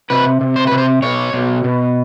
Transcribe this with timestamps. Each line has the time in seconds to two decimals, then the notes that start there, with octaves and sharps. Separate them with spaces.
0.10 C3 B4
0.41 C3
0.56 C5
0.67 C3 B4
0.78 C5
1.02 B2 C#5
1.33 B2
1.64 B2